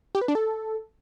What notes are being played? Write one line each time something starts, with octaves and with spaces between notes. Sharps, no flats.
G4
B4
D4
A4